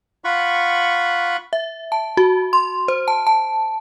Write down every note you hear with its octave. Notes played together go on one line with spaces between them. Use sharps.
F4 F#5 B5 C#6
E5
A5
F#4
C6
C5
A5
A5